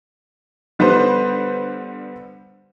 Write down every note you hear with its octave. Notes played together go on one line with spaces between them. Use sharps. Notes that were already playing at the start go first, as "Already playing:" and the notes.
D3 G3 B3 B4 C5